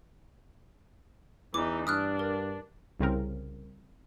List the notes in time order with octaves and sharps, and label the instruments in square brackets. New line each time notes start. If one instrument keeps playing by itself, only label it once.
[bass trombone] E2 [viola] E3 D#4 [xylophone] D6
[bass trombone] G2 [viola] D4 [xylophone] D#6 F6 F#6
[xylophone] A#4
[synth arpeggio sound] C2 C#3 C4 A#4